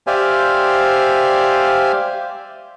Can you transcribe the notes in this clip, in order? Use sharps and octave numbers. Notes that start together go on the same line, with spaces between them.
G4 C5 D5 E5 F5 G#5